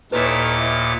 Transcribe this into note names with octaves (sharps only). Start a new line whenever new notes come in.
D#2 A#2 A3 D#4 E4 B4 C#5 D6
E4